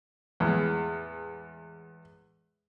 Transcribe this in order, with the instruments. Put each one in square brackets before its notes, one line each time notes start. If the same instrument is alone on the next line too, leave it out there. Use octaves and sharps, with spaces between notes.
[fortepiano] E2 A2 G#3